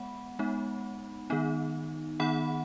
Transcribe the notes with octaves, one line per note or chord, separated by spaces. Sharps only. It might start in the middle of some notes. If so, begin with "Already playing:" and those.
Already playing: G#3 B3 F#5 B5
G#3 B3 D#4
D#3 B3 D#4
D#3 B3 D#4 F#5 B5